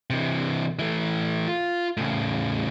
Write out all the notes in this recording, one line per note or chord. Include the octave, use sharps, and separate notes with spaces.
C3 E3
E3 A3
F4
A2 C#3